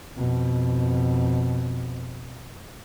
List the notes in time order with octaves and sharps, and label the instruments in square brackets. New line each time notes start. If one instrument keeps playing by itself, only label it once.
[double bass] F2 B2